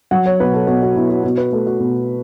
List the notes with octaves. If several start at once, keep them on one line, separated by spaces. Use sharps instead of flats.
F#3 F#5
C#5
B2 B4
A4
B2 F#4
F#4
B2 E4
F#4
B2 F#4
B4
A3 A4
F#4
B2